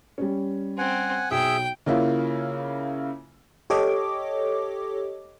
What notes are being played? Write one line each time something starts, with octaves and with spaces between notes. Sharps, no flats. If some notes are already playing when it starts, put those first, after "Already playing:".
G3 C#4
C4 F#5 G#5
B1 G#4 E5 G5 E6
C#3 A#3 E4 F4
G4 A4 C#5 D#5 D6